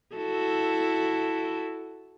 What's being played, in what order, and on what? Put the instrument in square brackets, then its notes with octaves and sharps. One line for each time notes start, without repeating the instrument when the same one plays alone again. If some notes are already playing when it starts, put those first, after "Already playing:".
[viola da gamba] E4 F#4 A4